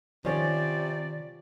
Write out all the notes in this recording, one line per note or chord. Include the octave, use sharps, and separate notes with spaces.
C3 D#3 F3 C#4 D5